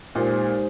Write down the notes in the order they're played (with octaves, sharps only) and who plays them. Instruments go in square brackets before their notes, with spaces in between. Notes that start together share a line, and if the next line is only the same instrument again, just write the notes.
[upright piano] A#2 [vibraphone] G#3 D#4 G4 C5